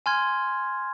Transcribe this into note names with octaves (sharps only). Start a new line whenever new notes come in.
G#5 C6 F6 G#6